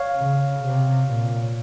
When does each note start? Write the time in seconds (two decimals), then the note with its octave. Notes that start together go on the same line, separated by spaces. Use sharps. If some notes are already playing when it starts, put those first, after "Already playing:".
Already playing: C#5 F5
0.17 C#3
0.65 C3
1.12 A#2